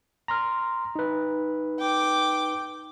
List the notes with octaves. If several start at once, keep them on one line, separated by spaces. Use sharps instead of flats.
A#5 C6 F6
D#4 B4
G5 D6